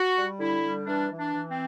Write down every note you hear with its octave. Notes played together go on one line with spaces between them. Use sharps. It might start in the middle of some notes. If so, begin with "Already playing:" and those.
Already playing: F#4
G3
D3 E4
G3
E3 D4
E3
D4
E3
C4